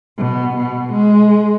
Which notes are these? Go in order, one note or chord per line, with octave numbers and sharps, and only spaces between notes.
B2
B2
G#3